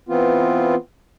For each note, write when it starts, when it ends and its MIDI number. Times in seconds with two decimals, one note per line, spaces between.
0.09 0.75 52
0.09 0.75 59
0.09 0.75 60
0.09 0.75 65